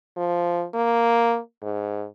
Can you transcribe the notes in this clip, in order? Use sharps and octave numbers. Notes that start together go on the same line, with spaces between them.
F3
A#3
G#2